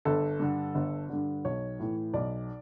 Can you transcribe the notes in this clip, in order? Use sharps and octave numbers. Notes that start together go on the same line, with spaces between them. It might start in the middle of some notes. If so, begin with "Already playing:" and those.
G1 A4
G2 D3
G1
G2 D3
B1 C#5
A2 E3
B1 D5